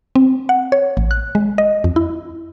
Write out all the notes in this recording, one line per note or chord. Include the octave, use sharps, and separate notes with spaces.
C4
F#5
C#5
A1
F#6
G#3
D#5
F2
E4